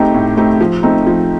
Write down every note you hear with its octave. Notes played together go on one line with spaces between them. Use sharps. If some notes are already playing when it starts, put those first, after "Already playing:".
Already playing: A3 C4 D#4 G4
A2
A3 C4 D#4 G4
F3
A3 C4 D#4
F3